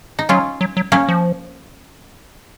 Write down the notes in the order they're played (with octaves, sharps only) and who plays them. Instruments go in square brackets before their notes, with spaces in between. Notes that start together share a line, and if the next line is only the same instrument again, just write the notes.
[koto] D#4
[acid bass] F#3 [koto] C#4 F4
[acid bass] F#3
F#3
[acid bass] F#3 [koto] A#3 C#4
[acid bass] F3